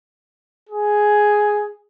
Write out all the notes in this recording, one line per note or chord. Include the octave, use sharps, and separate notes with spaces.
G#4